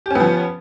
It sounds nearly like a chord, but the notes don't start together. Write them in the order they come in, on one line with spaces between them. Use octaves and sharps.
G4 C#4 B3 F3